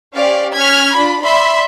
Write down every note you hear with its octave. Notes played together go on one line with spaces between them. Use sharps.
C#4 G4 C5 D5 F5
C#4 F6 G#6 B6
D4 F4 B5
D5 E5 B5 C6